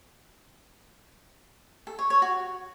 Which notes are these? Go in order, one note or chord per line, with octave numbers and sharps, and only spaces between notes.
A4
C#5
C#5
F#4